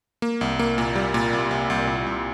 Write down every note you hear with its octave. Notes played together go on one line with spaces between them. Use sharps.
A#3
C2
A#3
A#2
G3
A#2
C2
C2
C2
A#2
C2